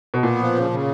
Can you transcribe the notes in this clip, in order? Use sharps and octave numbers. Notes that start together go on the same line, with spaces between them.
B2
A#2 B3
F3
C#3
C#3